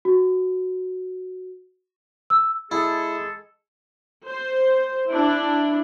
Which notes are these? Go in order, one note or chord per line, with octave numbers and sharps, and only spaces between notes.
F#4
E6
G#3 E4 G#4 A4
C5
D4 E4